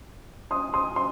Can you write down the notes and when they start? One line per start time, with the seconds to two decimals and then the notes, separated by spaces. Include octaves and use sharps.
0.51 C6 D#6
0.74 C6 D#6
0.96 C6